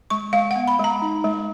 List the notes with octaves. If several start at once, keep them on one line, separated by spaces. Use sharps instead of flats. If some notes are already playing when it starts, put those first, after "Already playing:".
G#3 C#6
G#3 F5
F#5
B3
B5
G#3 A#5
D#4
G#3